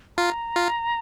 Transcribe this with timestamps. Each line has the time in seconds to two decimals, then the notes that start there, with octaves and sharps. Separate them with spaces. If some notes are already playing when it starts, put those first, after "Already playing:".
0.17 F4 A#5
0.56 F4